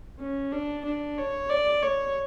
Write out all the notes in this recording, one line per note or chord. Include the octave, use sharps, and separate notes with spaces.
C#4
D4
D4
C#5
D5
C#5